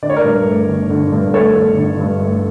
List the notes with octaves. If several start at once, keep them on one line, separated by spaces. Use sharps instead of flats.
D3 D5
C#5
A#4 D5
G2
A3
G1
D3
G2
A3 A4 C#5
G1
D3
G2
A3